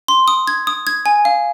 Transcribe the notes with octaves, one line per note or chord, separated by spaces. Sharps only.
C6
D#6
G#6
D#6
G#6
G#5
F5